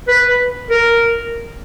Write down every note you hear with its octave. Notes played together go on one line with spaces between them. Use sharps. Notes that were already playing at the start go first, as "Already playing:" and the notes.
B4
A#4